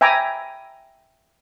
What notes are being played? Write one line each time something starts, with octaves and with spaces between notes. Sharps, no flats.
E5 G5 G#5 A#5 B5 D6